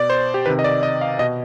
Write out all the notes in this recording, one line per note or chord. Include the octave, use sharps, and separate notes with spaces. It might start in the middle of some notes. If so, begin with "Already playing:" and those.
Already playing: B2 D5
C5
G4
C3 D#3 B4
D#5
D5
D#5
F5
B2 D#5